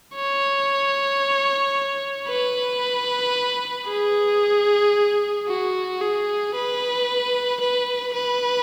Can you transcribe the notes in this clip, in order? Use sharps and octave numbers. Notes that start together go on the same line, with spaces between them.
C#5
B4
G#4
F#4
G#4
B4
B4
B4